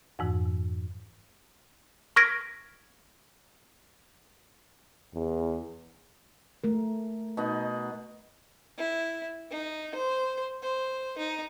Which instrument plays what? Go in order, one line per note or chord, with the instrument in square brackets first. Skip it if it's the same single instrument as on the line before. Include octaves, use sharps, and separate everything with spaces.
[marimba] F2 G#2 E3
[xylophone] C#6 F6 G#6 A#6 B6 D7
[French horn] E2
[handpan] A3 A#4
[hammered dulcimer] B2 D#4 F#5
[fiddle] E4
D#4
C5
C5
D#4